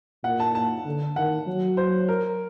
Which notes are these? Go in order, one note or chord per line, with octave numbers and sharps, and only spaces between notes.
A#2 F#5
A5
A5
D3
D#3 F#5
F#3
C5
A#4